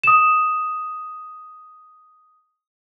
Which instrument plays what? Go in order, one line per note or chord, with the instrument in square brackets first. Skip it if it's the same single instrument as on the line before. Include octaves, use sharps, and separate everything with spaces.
[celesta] D#6 E7